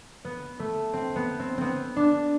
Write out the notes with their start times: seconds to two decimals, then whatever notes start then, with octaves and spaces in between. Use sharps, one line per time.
0.25 B3
0.60 A3
0.93 C4
1.16 B3
1.40 C4
1.58 B3 C4
1.96 D4